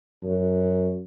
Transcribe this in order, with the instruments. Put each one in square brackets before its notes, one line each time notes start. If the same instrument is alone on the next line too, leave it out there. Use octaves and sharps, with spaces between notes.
[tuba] F#2